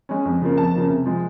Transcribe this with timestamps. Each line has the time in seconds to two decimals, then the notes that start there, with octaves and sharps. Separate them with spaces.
0.09 G#3 C#4
0.25 F2
0.42 C#3 F3 A#3
0.58 F2 A5
0.74 C#3 F3 A#3
0.90 C3
1.06 F3 G#3